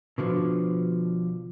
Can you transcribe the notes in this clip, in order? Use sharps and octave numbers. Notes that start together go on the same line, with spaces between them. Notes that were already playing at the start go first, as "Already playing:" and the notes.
B2 D3 F3